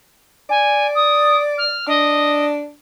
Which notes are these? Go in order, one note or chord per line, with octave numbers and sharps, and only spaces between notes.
D5 G#5
D#6
F6
D4 D#5